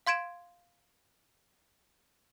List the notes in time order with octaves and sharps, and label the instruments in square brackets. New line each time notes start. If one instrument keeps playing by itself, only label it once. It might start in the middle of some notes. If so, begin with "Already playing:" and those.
[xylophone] F5 C6 G#6 D7 E7